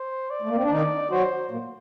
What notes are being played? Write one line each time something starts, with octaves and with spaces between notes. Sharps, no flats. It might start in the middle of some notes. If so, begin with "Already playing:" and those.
Already playing: C5
D5
A3
A#3
C4
D4
D#3 D#4 D5
F#3 F#4 C5
A#2 A#3